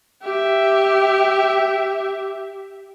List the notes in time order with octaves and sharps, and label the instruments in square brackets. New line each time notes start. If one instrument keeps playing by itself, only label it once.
[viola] G4 E5